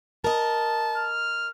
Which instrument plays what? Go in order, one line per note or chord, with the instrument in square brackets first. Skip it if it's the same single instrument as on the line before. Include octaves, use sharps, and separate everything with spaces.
[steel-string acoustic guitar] A#4 D#5 [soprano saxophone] A5
[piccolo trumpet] F6